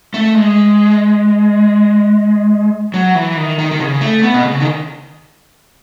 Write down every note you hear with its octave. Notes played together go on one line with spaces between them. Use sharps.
A3
G#3
F#3
E3
D#3
D#3
D#3
C#3
A3
B3
B2
C#3
D#3